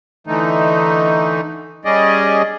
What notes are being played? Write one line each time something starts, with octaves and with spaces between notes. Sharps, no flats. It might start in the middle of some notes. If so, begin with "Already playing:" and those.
D3 E3 A3 D#4
G3 C#4 G#4 D5 D#5